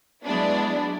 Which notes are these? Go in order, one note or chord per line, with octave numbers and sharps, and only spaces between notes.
F#3 G#3 B3 D4 E4